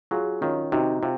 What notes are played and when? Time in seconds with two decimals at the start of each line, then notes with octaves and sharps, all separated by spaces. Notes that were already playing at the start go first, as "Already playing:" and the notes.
0.11 F#3 F4 G#4
0.41 D#3 C#4 F4
0.72 C3 D#4 F#4
1.02 C3 F4